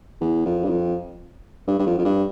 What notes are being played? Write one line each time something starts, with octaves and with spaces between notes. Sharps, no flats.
E2
F2
G2
F2
G2
G2
F2
F2
G2